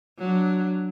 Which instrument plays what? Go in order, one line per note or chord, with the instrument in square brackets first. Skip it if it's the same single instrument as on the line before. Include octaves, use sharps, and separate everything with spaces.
[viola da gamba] F#3 D4